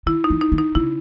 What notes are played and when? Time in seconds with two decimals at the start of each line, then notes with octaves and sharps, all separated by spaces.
0.06 D#3 E4
0.24 D#4
0.30 E3
0.41 D#4
0.52 D#3
0.58 D#4
0.75 C#3 E4